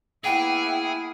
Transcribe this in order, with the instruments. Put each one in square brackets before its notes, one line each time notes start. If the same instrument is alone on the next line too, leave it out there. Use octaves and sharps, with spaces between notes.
[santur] A#3 B3 F#5 [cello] E4 [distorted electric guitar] G#4 [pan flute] G5